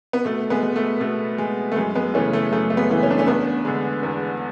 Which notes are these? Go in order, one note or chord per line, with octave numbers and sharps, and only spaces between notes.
B3
B2 A3
G#3 B3
G#3
A3
B2 A3
G#3
A3
F#2 G#3
G#3 B3
C#3 E3 A3 C#4
A3
F#2 A3
A3
G#3 B3
C#3 E3
C#4
D4
A3 C#4
E2 B3 D4
D3 G#3
E2